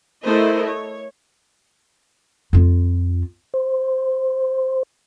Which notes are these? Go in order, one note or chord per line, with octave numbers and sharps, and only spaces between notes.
A3 E4 A4 A#4 C5 D#5
C#5
F2 F4
C5